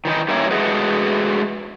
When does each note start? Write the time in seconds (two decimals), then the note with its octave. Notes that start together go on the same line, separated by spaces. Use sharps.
0.05 D#3 E3 D#4
0.29 G3 A#3 C#4 D#4 E4 A#4
0.51 G#3 A3 F#4 G#4 B4